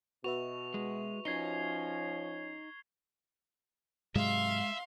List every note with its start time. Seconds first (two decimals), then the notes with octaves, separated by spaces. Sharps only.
0.24 B2 F#4 B4 E5 C#6 F7
0.74 G#3
1.25 F3 C#4 D#4 G#6 C7 G7
4.15 G#2 C3 F#3 G#3 E5 F5 C6